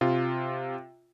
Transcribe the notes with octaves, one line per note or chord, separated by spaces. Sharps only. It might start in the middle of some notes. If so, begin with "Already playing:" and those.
C3 F4